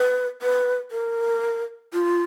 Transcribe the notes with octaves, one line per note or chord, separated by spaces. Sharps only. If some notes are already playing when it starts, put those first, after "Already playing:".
Already playing: B4
B4
A#4
F4